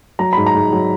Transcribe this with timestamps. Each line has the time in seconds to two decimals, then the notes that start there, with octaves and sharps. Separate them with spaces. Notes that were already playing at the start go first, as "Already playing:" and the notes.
0.19 F#3 A#5
0.33 G#2 B5
0.47 A#5
0.54 G#2
0.73 F#3